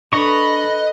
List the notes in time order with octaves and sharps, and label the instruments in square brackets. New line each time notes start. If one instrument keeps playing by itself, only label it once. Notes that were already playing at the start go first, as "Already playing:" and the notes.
[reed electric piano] D4 D#6 [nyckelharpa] A4 B5 [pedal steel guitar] B4 A#5 C#6 [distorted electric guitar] D#5